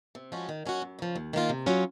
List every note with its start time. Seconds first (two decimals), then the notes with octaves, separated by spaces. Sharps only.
0.15 C3
0.32 F3 G#3 C#4 F#4
0.49 D#3
0.66 F#3 C#4 F#4
0.82 F#2
0.99 C#3 F3
1.16 D#2
1.33 D#3 A#3 F4
1.49 C3
1.66 F#3 C#4 F4